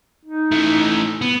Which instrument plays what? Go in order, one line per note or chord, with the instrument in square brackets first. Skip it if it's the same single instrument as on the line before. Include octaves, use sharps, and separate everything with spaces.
[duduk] D#4
[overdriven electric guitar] E3 A3
B3